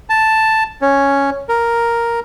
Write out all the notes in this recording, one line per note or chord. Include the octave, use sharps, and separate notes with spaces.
A5
C#4
A#4